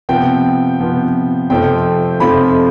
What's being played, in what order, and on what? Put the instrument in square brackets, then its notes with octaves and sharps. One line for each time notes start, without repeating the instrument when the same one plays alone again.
[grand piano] C3 F3 B3 G5
C3 F3 B3
F2 C3 F3 A3 C4 G5
F2 C3 F3 A3 C4 B5